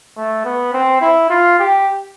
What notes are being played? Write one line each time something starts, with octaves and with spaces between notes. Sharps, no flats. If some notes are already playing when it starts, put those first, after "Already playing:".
A3
B3
C4
E4
F4
G4